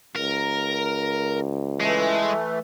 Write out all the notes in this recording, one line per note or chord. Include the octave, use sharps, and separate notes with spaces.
C#2 A#4
E3 G#3 A3